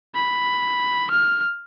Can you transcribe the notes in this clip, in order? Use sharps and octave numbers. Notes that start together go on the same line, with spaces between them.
B5
F6